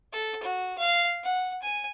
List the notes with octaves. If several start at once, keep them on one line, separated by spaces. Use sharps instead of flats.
A4
F#4
F5
F#5
G#5